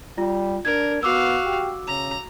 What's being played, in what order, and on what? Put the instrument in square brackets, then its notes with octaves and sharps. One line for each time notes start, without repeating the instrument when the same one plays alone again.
[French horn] G3 [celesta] F4
[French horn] D4 [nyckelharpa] A#4 [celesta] G#6
[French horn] B3 [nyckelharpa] F#4 F5 [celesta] D6 E6
[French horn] G4
[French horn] C#3 [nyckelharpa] A#5